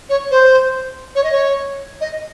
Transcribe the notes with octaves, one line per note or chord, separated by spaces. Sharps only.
C#5
C5
C#5
D#5
C#5
D#5